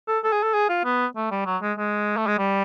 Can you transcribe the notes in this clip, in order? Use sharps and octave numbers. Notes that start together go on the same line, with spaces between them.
A4
A4
G#4
A4
G#4
F4
B3
A3
G3
F#3
G#3
G#3
A3
G#3
G3